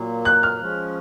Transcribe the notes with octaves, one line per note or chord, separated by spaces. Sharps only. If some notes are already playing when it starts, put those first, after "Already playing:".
Already playing: A#2 F#3 A#3
F#6
F6
F3 G#3 C#4